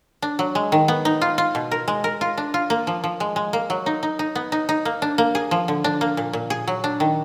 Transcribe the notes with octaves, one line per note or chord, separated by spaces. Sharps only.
D4
F#3
G#3
D#3
B3
D#4
F4
F4
B2
A#4
G#3
A#4
F4
D4
F4
A#3
F3
F3
G#3
G#3
A#3
F#3
D#4
D#4
D#4
B3
D#4
D#4
A#3
D4
A#3
G#4
F3
D3
D4
A#3
A#2
A#2
G#4
F#3
D4
D#3